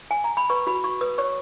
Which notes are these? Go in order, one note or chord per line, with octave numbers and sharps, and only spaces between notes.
G#5
A#5
B5
B4 C#6
F#4 B5
F#4 C#6
B4 D#6
C#5 C#6